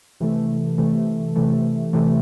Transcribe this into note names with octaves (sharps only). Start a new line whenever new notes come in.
C3 E3 A3
C3 E3 A3
C3 E3 A3
C3 E3 A3